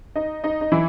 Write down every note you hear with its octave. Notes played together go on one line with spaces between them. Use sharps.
D#4 D#5
D#4 D#5
D#4
E3 E4